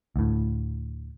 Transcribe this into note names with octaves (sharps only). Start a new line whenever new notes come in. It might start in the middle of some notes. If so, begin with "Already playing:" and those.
D2 A2